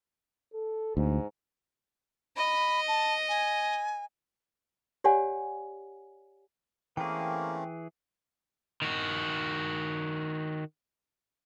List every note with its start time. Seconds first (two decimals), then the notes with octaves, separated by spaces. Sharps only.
0.54 A4
0.97 D2 G#2
2.37 D#5 B5
2.88 A5
3.29 G#5
5.04 G4 C#5 D5 F#5 G#5
6.97 E3 A3 A#3 C4 C#4 G#4 G5
8.82 D#3 F#4